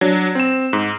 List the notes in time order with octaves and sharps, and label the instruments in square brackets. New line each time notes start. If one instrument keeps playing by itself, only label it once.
[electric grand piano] F#3 D4
C4 E7
G#2